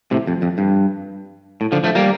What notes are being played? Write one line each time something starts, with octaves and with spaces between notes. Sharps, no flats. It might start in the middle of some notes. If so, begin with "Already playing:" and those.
A2 C3
F2
F2
G2
A2
D3 F3
F3 A3
G3 A#3